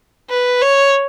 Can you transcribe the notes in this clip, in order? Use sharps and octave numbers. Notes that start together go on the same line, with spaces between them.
B4
C#5